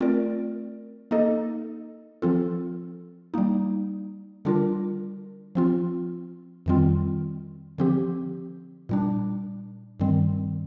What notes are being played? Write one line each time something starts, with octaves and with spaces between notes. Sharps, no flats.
A3 C4 F4 A#4 D5
A#3 D#4 A4 D#5
F3 C4 F4 A4
G3 A#3 D#4
D3 G3 D4 F4 A#4
F3 C4 F4
F2 D#3 G3 C4 F4
D3 F3 C4 G4
A#2 G3 D4
G2 D#3 G3 C4